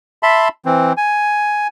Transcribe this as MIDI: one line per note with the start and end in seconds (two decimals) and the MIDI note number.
0.23 0.48 76
0.23 0.48 81
0.23 0.48 83
0.23 0.48 84
0.65 0.93 52
0.65 0.93 60
0.97 1.67 80